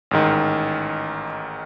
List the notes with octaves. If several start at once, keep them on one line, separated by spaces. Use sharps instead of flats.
A1 G#2 D#3